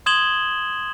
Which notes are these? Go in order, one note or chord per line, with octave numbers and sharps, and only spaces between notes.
C6 D#6 G#6 E7 F#7 G7